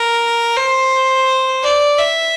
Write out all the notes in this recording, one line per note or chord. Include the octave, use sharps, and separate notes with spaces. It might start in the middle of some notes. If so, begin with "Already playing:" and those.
Already playing: A#4
C5
D5
E5